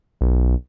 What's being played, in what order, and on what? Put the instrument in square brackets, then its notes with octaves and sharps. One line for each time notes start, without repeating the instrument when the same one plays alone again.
[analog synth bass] B1